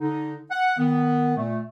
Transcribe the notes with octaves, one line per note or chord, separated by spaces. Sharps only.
D3 D#4
F#5
D#3 B3
A#2 A3